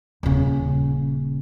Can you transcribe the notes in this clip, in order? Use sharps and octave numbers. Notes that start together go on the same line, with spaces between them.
D#1 C#3